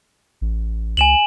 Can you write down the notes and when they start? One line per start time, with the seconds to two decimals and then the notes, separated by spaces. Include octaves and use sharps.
0.41 A1
0.97 C#2 G#5 E7 F#7